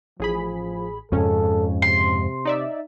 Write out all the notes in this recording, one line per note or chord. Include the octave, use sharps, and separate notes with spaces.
A1 F3 G#4 B5
F2 G#2 C#3 C#4 A4
C3 C6
D#4 D5 E5